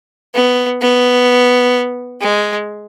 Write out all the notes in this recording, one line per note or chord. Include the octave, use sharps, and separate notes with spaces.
B3
B3
G#3